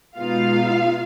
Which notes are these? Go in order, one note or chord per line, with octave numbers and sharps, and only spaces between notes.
B2 G#3 B3 D#4 F4 F5